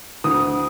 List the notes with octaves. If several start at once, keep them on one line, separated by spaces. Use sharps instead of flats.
D2 D#6